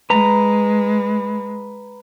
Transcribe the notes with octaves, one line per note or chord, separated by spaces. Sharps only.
G#3 B4 A#5